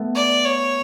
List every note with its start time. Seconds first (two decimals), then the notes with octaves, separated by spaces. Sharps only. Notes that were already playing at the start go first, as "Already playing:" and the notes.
Already playing: A3 B3
0.15 D5
0.45 C#5